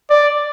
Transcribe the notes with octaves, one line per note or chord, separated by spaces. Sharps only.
D5